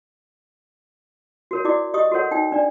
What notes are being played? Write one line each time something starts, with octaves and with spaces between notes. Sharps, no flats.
F#4 A#4 C#5
E4 F#4 D5 D6
G4 D#5 C#6 D#6
F#4 A4 A#4 C#5 F#5
D#4 G5
D4 D5